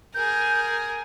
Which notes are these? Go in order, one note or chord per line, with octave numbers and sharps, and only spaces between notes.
G#4 A#4 G6